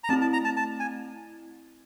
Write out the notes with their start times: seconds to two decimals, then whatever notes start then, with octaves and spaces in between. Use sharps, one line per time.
0.04 A#5
0.09 A3 C4 E4 A5
0.22 A5
0.33 A#5
0.45 A5
0.57 A5
0.80 G#5